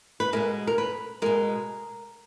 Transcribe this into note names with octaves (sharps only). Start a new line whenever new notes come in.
B4
B2 G#3 A#4
A#4
B4
B2 G#3 A#4